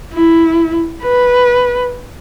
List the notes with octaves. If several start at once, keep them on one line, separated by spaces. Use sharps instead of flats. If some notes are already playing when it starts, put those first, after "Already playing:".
E4
B4